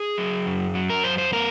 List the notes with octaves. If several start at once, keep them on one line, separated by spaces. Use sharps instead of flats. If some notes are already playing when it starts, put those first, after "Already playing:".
Already playing: G#4
F#3
F#2
F#3
A#4
F#2 C5
C5
B3 A#4